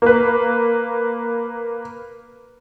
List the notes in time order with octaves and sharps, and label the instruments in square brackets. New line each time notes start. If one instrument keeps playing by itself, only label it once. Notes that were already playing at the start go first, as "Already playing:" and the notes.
[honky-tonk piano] A#3 B4